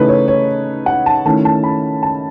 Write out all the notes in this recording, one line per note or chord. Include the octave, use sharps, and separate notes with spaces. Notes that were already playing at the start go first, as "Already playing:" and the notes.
Already playing: C#3 E3 A3 D#4 B4
C#5
C#5
F#5
A5
D#3 A3 C#4 E4 A5
A5
B5
A5